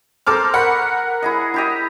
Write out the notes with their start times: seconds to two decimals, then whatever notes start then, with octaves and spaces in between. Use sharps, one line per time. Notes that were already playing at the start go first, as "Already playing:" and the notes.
0.27 C4 A4 A#4 C5 D6 F6
0.54 A#4 F#5 B5 C#6
1.23 E4 G#4 D#5
1.54 E4 G4 D#5